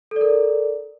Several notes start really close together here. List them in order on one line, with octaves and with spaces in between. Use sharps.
A4 D5 A#4